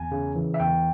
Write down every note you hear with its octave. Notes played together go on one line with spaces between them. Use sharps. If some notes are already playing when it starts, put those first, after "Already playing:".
Already playing: E2 G#5
C#3
E3
E5
E2 G5